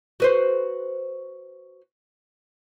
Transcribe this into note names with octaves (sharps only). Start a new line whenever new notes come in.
F#4 B4 C5